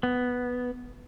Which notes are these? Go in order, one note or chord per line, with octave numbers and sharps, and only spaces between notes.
B3